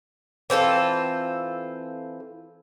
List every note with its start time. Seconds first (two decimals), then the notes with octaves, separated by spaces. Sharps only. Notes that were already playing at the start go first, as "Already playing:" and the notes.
0.50 E3 C4 F4 A4